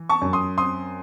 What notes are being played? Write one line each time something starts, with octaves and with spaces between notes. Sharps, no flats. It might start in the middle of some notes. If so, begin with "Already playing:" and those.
Already playing: E3
A5 C#6
F#2
C6 D#6
C4 C6 D#6